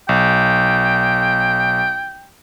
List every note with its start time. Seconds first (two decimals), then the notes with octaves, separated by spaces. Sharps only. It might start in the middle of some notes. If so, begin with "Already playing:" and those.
0.09 B1 G5